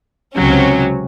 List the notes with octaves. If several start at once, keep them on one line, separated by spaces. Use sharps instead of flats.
C#2 C3 F#3 C#4